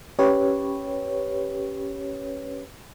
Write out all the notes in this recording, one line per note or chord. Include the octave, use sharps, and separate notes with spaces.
C#4 G4 B4 C#5